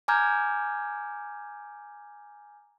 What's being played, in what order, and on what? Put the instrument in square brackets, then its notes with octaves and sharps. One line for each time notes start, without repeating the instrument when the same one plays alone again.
[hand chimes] G#5 A#5 D6 F6 G6 G#6